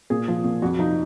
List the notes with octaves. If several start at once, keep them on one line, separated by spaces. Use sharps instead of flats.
A#2 G#4
F3
A#2
F2 F#4
F3 D#4